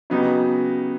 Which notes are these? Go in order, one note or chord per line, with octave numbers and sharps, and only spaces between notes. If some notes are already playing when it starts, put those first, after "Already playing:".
C#3 F#3 B3 D#4 G4